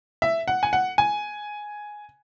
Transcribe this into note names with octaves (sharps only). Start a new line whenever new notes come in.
E5
F#5
G#5
F#5
G#5